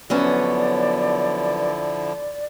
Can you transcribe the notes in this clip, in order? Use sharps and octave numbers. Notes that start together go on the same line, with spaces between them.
D3 F3 F#3 B3 C#4 E4 D5